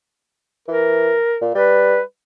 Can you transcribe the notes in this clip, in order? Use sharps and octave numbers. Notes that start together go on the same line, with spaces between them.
E3 A#4
A#2
G3 B4